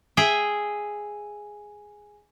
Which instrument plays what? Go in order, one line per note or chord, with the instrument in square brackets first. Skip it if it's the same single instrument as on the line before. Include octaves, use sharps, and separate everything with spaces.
[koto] G#4 E5 G5